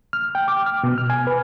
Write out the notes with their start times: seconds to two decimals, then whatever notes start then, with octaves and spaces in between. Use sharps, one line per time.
0.13 F6
0.35 G5
0.48 D6
0.66 F6
0.83 B2
0.98 F6
1.10 G#5
1.27 B4